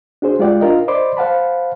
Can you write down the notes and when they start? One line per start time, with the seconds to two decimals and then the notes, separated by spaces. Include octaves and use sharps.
0.22 D4 F#4 G#4 C5
0.39 G#3 F4 G4 D5 F#5 G5
0.61 D4 F4 A#4 D#5
0.88 C5 D5 D#5 B5 C6 D6
1.17 C5 F5 F#5 A5 B5